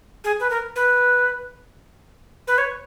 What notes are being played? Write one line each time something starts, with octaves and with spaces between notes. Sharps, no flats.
G#4
B4
A#4
B4
B4
C#5